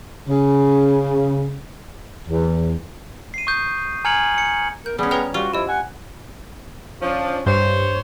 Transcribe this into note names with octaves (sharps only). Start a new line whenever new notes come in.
C#3
E2
C7 D#7
C#6 D#6 G6
G#5 A#5 F6 G#6 C#7 F#7
C#7
A#4 G6
G3 B3 C#4 G#4
B4 C#5 G5 A#5 F6
G3 F4 F#4
F3 E4 G4 D#5
F#5 G#5
F3 C#4 D4
G2 C5 C#5